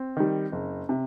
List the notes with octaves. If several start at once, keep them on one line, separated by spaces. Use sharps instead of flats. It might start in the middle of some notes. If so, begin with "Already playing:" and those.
Already playing: C4
D#3 G3
F#1
C3